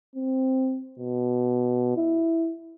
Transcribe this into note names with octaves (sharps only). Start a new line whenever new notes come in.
C4
B2
E4